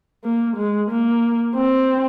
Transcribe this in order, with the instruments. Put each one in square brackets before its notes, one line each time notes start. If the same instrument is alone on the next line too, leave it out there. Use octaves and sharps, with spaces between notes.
[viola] A#3
G#3
A#3
C4